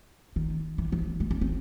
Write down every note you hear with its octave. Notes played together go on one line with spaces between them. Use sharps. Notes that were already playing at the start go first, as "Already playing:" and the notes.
D#3
E3
E3
A3
C4
C4